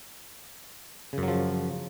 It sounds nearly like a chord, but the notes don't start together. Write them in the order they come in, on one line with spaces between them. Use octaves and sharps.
C#3 F#2 F#3 F3